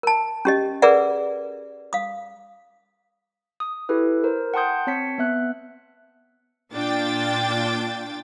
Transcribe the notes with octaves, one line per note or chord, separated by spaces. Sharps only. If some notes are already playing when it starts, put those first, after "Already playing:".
A#4 A5
C#4 G4 D#5
G#4 A#4 B4 D5 E5 F#5
F5 D#6
D#6
E4 G4 A4 B4
A#4 C5
F#5 G5 A5 C6 D#6 G6
C4 C#5 A5 B6 C#7
B3 E5 F#6
A#2 D4 F4 G5 A6